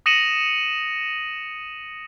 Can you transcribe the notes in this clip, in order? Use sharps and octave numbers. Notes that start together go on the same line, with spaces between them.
D#6 A#6 C#7 D#7 E7 F#7